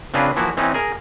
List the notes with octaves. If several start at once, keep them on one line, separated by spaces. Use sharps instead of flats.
C#3 C4 D4 F4 G#4 B4
E3 F3 A#3 E4 F#4
E3 C4 C#4 D#4
G#4 A#4